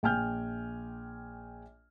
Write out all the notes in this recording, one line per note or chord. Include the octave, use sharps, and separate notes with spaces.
A#1 G5 G#5 F6 G6